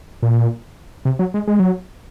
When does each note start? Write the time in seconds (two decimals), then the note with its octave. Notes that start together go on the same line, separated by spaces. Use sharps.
0.22 A#2
1.05 C3
1.19 F#3
1.34 G#3
1.48 G#3
1.60 F#3